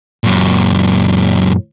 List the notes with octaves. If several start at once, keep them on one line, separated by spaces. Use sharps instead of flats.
F#2 A#2